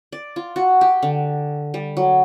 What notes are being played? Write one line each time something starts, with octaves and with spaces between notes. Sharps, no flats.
D5
F4
F#4
G4
D3
G3
F#3